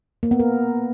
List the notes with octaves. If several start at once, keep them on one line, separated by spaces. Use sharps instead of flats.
A#3
B3
A#4